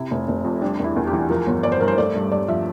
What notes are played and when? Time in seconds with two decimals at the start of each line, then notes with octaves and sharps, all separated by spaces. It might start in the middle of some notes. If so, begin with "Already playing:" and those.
Already playing: C3 E4
0.11 F1
0.28 F1
0.44 F2
0.61 G3 D4
0.80 E2 E4
0.96 E2
1.07 G4
1.13 E3
1.30 F3 A#4
1.47 G1
1.63 G1 D5
1.72 C5
1.81 G2 A#4
1.88 C5
1.98 A3 D5
2.15 G2
2.32 G2 D5
2.48 F3 E5